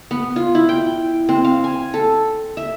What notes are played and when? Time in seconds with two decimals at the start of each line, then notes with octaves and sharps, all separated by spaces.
0.11 B3
0.36 F4
0.55 E4
0.69 G5
1.29 C4
1.44 F5
1.64 G#5
1.94 A4
2.57 E5